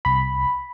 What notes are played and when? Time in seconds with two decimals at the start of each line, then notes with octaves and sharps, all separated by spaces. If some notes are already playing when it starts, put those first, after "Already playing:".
0.05 C2 B5